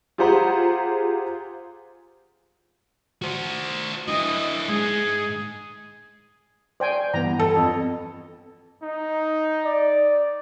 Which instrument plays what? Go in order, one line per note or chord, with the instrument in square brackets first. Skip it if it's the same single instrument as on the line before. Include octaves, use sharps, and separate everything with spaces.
[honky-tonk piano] F4 G4 G#4 C5 F#5 A#5
[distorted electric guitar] F#4 C5
[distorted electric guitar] D3 E4 [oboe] D#5
[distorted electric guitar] G#2 [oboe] G#4
[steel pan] C5 G5 G#5 [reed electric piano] D5
[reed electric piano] G2 E3 [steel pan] B3 A#5
[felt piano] A4
F2
[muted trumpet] D#4
[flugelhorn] D5